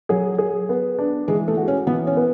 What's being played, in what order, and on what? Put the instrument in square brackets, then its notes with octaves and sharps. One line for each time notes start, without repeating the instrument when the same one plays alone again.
[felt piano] F#3 [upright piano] G#4
[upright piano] G#4
B3
D4
[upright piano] E3 [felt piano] G#3
[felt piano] A3
[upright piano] F#4
[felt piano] C#4
[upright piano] E3 [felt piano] B3
[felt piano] C#4
[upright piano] B3